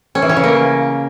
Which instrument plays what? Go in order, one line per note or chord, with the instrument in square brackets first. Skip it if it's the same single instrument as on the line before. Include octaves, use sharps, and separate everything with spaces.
[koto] C#4
E3
C#4
C#3
A#3